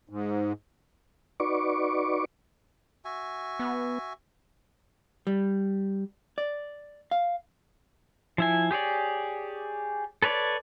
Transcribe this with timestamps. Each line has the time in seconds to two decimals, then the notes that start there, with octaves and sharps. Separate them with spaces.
0.09 G#2
1.40 D#4 F#4 B4 D5 C#6 D6
3.05 F#4 E5 G#5
3.60 B3
5.27 G3
6.38 D5
7.11 F5
8.38 F3 E4 G#5
8.71 G4 G#4 C#5 D5
10.22 A4 B4 C#5 D5